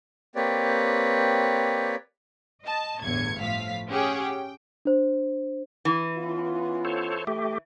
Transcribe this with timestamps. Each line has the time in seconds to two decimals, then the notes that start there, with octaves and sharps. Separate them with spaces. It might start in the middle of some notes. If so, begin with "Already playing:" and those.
0.35 A#3 C4 G4 B4 C#5 D5
2.64 D#5 A5
3.01 G1 E2 A2 G#6 C#7
3.39 A2 F3 F5 B6
3.89 C#4 G4 G#4 F#5 G5
4.23 G5
4.85 D4 C5
5.85 E3
6.17 B3 C#4 F4
6.85 A4 C5 C#5
7.27 A3 G4